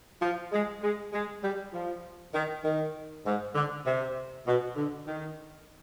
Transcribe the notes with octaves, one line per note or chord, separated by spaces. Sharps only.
F3
G#3
G#3
G#3
G3
F3
D#3
D#3
G#2
D3
C3
B2
D3
D#3